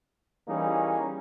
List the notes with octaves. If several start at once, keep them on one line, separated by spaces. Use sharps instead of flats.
E3 G3 A#3 C#4 D#4 G#4